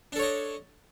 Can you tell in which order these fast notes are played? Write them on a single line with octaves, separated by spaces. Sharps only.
D4 A4 C#5 D#5